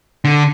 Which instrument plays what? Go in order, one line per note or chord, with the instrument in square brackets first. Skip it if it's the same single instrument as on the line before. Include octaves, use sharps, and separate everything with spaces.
[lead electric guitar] D3